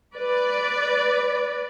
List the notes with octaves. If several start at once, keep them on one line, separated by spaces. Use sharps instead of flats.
B4 D5